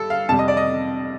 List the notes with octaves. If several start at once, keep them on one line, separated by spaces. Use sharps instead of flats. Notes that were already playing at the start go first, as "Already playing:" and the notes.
Already playing: G2 A4
F5
F2 C3 G3 A5
D#5
D5
D#5